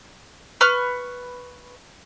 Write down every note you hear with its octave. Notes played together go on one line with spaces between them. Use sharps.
B4 C#6 F6